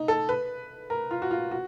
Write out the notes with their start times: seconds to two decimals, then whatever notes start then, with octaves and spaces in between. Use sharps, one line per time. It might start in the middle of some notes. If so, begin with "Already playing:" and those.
Already playing: D#4
0.08 A4
0.29 B4
0.90 A#4
1.11 F4
1.22 F#4
1.31 F4
1.51 F#4